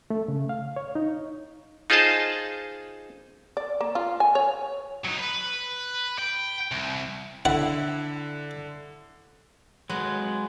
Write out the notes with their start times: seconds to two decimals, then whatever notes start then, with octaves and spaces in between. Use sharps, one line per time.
0.10 A3
0.28 C#3
0.49 F5
0.76 C#5
0.95 D#4
1.90 D#4 F4 G#4 C5 D#5 A5
3.57 D5
3.81 A#3
3.95 F4
4.20 G#5
4.35 C#5
5.04 F#3 D#4
5.19 B4
6.18 G5
6.71 C2
7.45 D3 E4 F#5
9.90 F#3 G#3 B4